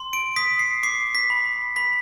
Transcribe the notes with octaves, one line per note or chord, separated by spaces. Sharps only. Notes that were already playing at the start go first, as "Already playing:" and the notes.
Already playing: C6
D7
D#6 B6
C7
D6 C7
B6
B5
B5 B6